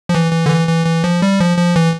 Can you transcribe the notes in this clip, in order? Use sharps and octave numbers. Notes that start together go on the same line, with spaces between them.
F3
E3
E3
D3
E3
E3
E3
F3
G3
F3
F3
E3